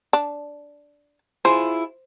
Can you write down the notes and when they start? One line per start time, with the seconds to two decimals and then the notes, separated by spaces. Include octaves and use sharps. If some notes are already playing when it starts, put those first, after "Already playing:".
0.13 D4
1.45 E4 F4 G#4 C5